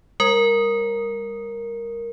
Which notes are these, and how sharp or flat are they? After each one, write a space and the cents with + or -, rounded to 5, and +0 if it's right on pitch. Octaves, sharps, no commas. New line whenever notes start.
G3 +40 A#4 +0